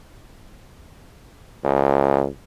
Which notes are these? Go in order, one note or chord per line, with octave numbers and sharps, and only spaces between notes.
C#2